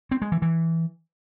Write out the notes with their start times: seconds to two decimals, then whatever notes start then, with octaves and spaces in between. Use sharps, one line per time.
0.11 C4
0.22 G#3
0.32 E3
0.42 E3